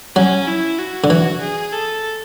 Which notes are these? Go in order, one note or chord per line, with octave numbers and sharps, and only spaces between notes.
F#3 C#4
E4
F#4
D3
E3 F#4
G#4
A4